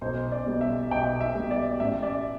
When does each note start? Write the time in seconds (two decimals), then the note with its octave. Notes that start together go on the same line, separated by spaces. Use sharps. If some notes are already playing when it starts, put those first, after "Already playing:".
0.01 B1 C5
0.32 D5
0.46 B2 G3
0.61 E5
0.91 B1 G5
1.21 E5
1.35 B2 G3
1.51 D5
1.80 A1 E5
2.02 D5